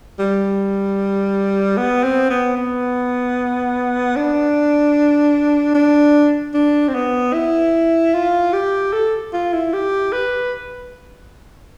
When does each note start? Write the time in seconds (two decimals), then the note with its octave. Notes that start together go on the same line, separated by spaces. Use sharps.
0.19 G3
1.77 B3
2.03 C4
2.30 B3
2.57 B3
4.16 D4
5.75 D4
6.54 D4
6.88 C4
6.94 B3
7.33 E4
8.14 F4
8.53 G4
8.93 A4
9.33 F4
9.53 E4
9.73 G4
10.12 B4